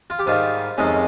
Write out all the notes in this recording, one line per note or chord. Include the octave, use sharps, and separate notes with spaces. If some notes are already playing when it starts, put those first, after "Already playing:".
F4
G4
G#2 D#3 G3 F4
F2 C3 D#3 G#3 C#4